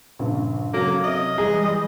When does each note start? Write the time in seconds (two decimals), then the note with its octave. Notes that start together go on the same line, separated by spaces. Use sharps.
0.19 A#1 G2 C#3
0.74 C#3 F#3 A#3 A4
1.03 C3 D#5 E5 F6
1.38 E3 G3 G#3 G#4 A#5